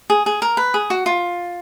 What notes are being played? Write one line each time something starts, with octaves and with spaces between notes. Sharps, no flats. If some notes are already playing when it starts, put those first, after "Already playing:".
G#4
G#4
A#4
B4
G#4
F#4
F4